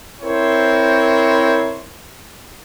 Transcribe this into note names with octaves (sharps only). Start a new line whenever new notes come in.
C4 E4 A#4 C5 C#5